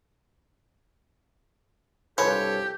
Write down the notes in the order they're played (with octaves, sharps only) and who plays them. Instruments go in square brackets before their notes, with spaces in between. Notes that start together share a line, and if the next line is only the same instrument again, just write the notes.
[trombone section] C2 G2 A4 [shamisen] F3 G#3 B4 [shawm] G4 [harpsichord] C#5